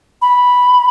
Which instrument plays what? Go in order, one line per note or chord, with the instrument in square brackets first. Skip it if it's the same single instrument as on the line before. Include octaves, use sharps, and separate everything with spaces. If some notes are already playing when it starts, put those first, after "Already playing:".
[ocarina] B5